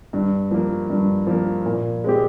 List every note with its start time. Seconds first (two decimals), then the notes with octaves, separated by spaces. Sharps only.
0.13 G2
0.51 F3 A#3
0.90 G2
1.27 F3 A#3
1.66 A#2
2.04 G#3 C4 G4